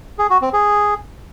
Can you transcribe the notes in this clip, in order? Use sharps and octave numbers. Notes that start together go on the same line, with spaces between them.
G#4
F#4
C4
G#4